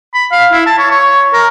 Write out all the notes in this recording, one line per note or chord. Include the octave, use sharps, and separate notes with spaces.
B5
F5
E4
A5
C#5
C#5
A#4